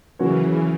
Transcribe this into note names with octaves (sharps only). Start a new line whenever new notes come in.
C#3 E3 F#3 A#3 C#4 F#4 C#5